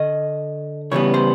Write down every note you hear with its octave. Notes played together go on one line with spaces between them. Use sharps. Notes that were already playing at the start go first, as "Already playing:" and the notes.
Already playing: D3 D#5
C#3 E3 G3 B3 C#5
C5